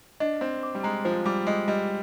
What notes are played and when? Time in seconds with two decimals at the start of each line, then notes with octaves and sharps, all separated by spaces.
0.20 D4 D#5
0.41 C4 C5
0.63 D6
0.75 G3
0.84 G#3 A#5
1.05 F3 C5
1.25 G3 D6
1.47 G#3 D#5
1.68 G3 D#5